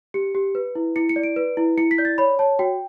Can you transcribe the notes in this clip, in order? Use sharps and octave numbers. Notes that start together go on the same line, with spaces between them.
G4 C#7
G4
B4
E4
E4 C#7
C#7
D5
D7
B4
E4
E4 C#7
B6
D5 G6
A6
C#5 B5
C#5 A5
F#4 G5